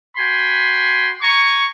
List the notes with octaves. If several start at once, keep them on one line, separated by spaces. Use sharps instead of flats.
F#4 G5 G#5 B5 C6
G#5 A#5 C#6